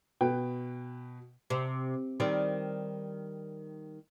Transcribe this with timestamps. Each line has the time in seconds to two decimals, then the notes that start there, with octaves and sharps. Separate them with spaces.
0.21 B2 B4 G5
1.50 C3
2.20 D#3 G3 C4